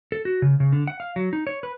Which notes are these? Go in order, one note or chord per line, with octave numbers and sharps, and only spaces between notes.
A4
F#4
C#3
C#3
D3
F#5
F5
F#3
D#4
C#5
B4